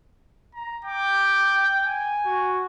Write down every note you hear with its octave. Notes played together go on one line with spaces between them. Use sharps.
A#5
G5 D6
G#5
F#4